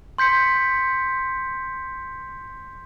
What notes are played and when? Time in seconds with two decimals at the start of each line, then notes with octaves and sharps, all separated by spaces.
0.18 C6 G6 B6 C#7